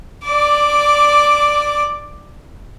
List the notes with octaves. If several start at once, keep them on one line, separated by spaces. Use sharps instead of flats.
D5 D6